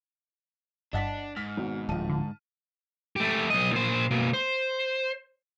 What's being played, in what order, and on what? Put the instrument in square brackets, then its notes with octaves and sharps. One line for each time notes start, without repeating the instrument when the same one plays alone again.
[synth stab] G1 G2 A5 [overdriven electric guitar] D4 [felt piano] D#5 F#5 B6
[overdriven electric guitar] G#2 [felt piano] F6 B6
[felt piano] G#1 B2 F#4
[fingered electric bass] D1 F3 [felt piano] A5 D#7
[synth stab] D3
[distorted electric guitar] A3 G4
B1 D#5
A#2 C5
B2 A#3
C5